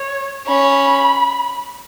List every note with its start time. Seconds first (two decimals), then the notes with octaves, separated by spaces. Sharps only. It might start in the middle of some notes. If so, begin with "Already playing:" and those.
Already playing: C#5
0.47 C#4 B5